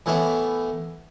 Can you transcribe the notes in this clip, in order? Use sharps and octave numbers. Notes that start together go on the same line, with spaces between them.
A2 E3 A3 B3